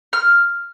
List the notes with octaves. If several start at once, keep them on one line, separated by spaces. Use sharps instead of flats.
F6